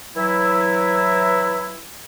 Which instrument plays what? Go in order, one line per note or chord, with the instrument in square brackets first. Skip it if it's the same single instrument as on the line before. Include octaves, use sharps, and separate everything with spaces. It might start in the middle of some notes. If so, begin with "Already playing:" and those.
[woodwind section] E3 F#3 E4